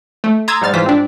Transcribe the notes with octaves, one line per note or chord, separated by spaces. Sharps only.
A3
A#5 C6 D#6 E6 G#6 A6
G#2 G3 F6 A6
G#2 E3 F4 C5 B6
C4 D4